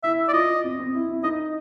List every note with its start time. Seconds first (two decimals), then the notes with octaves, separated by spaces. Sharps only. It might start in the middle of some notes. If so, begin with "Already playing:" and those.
0.03 E4 E5
0.28 D5
0.33 F4 D#5
0.64 C4
0.79 C4
0.94 E4
1.09 E4
1.24 D#4 D#5